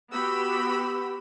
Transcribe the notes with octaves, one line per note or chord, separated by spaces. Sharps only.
B3 F#4 G4 B5 E6